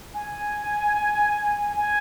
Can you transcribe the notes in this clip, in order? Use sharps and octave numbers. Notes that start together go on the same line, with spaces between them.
G#5
G#5